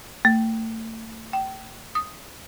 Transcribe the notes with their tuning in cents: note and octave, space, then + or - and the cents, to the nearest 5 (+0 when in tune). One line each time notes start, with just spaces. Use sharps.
A3 +35
G5 -25
D#6 +0